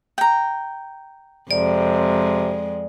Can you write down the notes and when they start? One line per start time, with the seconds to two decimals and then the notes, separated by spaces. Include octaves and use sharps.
0.18 G5 A#5
1.51 F2 C3 G#3 D5